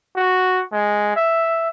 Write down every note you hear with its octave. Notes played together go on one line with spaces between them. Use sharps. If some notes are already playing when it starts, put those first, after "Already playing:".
F#4
G#3
E5